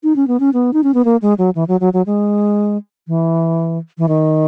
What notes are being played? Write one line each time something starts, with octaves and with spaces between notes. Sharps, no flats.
D#4
C#4
B3
C#4
B3
D#4
C#4
B3
A#3
G#3
F#3
E3
F#3
F#3
F#3
G#3
E3
E3
D#3